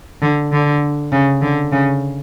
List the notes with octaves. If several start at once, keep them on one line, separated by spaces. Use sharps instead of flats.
D3
D3
C#3
D3
C#3